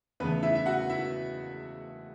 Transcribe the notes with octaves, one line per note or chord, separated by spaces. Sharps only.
E2 C#3 A3 B3 B4
E4 E5
E5
F#4 F#5
E4 E5